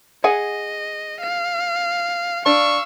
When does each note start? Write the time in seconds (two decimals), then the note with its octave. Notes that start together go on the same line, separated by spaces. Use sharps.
0.24 G#4 D#5 F#5 G#5
1.20 F5
2.46 D4 F5 C#6 E6